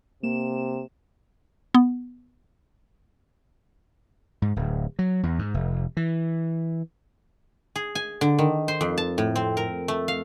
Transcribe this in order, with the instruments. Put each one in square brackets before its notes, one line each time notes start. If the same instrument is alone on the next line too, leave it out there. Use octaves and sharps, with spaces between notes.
[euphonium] C3 [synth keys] A#3 E7
[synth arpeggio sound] B3
[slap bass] G#2
D1
F#3
E2
G#2
F1
E3
[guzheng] G#4
G#5
D3
D#3
C5
F2
A5
A2
C4
A#4
A3
F5